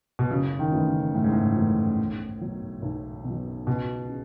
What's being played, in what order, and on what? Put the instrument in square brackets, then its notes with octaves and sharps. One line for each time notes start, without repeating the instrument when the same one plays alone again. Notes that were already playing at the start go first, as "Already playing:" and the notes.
[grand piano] B2
[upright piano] F#1 [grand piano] C#3
[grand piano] D#3
[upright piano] F#2 E3 A3 E4
[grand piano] C#3
[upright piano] F#1 [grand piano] A2
[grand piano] G#2
A2
[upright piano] F#2 E3 A3 E4
B1
B2 F#3
B1
B2
F#3
[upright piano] C#2 [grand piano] B2
[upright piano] C#3